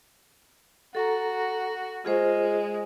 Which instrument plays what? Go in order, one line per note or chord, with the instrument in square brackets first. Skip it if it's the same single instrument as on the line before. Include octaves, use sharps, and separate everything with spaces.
[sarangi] F#4 [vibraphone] A4 A#5
[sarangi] G#3 [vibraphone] F4 G#4 C5